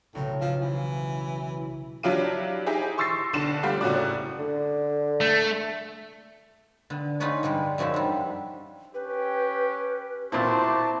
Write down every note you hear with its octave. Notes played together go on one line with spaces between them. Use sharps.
B1 A2 C#3
F3 E4
E3
F#3 D4 E4 G4 F5 D#7
D#4 E4 G4 G#4
C6 C#6 E6 A6 A#6 C7
B1 D3 D4 E7
G3 A3 F4 G4 F5 F#5
F#1 A2 C#4 F#4 D5
D3
A3
D3 B3
D#4 F4 G#4 B4 C#5 D5
G2 D3 G3 G#3
F#2 F3 F#3 D#4 E5
G3 D4
C#4 G4 B4 G5
A#2 C4 E4 F#4 C5 A5 D6